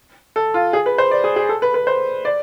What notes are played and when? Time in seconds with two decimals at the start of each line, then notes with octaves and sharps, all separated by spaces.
0.36 A4
0.54 F4
0.73 G#4
0.86 B4
0.98 C5
1.11 D5
1.24 G#4
1.36 G#4
1.49 A4
1.62 B4
1.74 B4
1.87 C5
2.25 D5